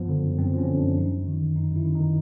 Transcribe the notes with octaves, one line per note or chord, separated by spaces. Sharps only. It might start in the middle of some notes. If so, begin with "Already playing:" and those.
Already playing: F#2 F3 B3
D3
F#2
F#2 C4
F3 C#4
D3
D4
F#2
F#2 D#4
F#2
D#3
D#3
F#2 D#4
F#2 E4
D#3
D#3 D#4